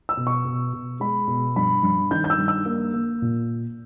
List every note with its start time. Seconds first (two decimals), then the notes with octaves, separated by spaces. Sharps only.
0.09 E6
0.17 B2
0.27 C#6
0.45 B2
0.73 B2
1.00 G#3 B5
1.28 B2
1.56 G2 B5
1.83 G2
2.11 D#3 G6
2.24 G6
2.30 E6
2.38 G2
2.48 E6
2.66 A#3
2.93 A#3
3.22 A#2